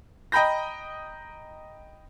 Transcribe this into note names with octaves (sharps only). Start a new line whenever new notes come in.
D#5 G5 A#5 B5 G6 A#6